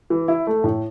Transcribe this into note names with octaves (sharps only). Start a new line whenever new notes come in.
E3
E4
A3
A2